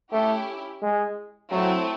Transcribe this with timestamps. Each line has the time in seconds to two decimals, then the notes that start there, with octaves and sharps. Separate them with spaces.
0.12 A3 C#4 E4 G4
0.82 G#3
1.51 F#3 A3 C4 E4